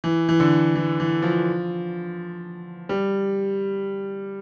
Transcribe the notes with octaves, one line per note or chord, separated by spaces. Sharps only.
E3
E3
D3
E3
E3
F3
G3